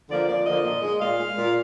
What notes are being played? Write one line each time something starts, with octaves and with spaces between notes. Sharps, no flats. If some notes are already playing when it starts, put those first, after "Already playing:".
D3 F3 A#3 D5
F2 D5
D3 F3 A#3 D#5
A#2
G#3
A#2 F5
G#3
A#2